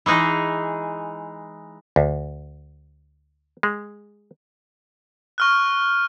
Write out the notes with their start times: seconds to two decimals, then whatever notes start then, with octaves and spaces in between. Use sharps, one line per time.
0.06 E3 G#3 D#4 G#4
1.96 D2
3.63 G#3
5.38 C#6 F6 F#6